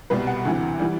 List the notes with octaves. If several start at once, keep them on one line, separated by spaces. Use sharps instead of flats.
C2 B2 G3 B4
F#5
D2 C3 E3
E3 G3